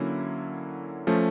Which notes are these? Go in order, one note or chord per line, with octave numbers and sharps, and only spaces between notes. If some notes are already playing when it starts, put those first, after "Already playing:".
Already playing: D3 F#3 A#3 C#4 E4
F3 A3 C#4